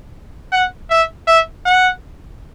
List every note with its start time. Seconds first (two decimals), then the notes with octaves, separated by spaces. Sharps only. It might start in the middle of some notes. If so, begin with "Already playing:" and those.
0.52 F#5
0.90 E5
1.27 E5
1.66 F#5